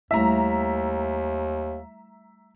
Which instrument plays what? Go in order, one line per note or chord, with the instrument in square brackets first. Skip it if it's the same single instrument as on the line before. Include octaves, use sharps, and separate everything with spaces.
[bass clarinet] D#2 [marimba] G3 A3 E4 [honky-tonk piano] E5 A#5